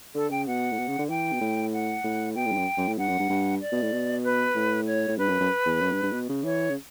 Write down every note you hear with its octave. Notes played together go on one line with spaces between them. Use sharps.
D3 A4
C#3 G5
B2 F#5
A2
B2
C#3
D3
E3 G5
B2
A2
F#5
A2
B2 G5
A2
G2
F#2
F#2
A2
G2 F#5
F#2
G2
G2
D5
B2
A2
B2
B4
A2
C#5
A2
G2 B4
F#2
F#2
E2
F#2
G2
G2
B2
C#3
E3 C#5
C#3